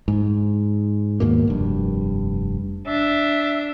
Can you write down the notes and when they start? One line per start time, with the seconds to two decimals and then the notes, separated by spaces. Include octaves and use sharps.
0.08 G#2
1.20 D#2 G#2 B2 A#3
1.48 F1 G2
2.87 D4 E5